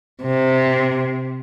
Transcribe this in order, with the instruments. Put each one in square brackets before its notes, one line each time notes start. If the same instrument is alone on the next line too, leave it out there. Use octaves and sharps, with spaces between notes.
[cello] C3